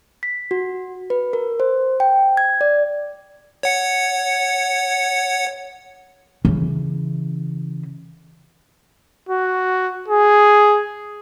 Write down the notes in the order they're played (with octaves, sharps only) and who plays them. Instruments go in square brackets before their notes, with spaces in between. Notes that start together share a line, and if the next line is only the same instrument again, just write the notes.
[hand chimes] B6
F#4
B4
A#4
C5
G5
G#6
D5
[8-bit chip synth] C#5 F#5 C#7
[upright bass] C#3 E3
[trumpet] F#4
G#4